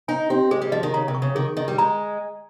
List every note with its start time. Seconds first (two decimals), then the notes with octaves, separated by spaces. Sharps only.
0.08 D#4 G#5
0.30 C4 G4
0.51 G#3 G#4
0.62 G3
0.72 F3 D#5
0.83 D#3
0.94 C#3 A#5
1.08 C3
1.15 C#6
1.22 C#3
1.35 D#3 G#4
1.57 D#3 D#5
1.68 G3
1.78 G#3 A#5